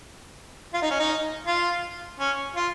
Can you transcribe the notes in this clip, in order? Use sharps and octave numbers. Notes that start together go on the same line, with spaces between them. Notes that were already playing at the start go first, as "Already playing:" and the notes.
F4
D#4
C#4
D#4
F4
C#4
F4